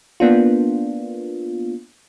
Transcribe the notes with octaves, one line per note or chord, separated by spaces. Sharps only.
A#3 B3 D4 F4